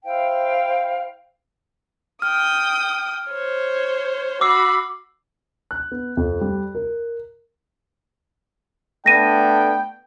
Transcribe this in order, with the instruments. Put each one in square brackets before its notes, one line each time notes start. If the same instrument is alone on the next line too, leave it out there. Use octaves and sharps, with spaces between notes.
[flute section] E4 C5 F5 G5
[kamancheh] G5 D#6 [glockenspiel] F6
[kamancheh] C5 C#5
[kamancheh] F#4 B5 [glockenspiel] D6 E6 C7
[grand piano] F#6
B3
F2
G3
A#4
[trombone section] A3 B3 D4 [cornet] G5 [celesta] A#6 D#7